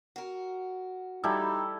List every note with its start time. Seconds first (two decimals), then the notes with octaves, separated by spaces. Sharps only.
0.16 F#4 A#4
1.23 G3 D#4 E4 A4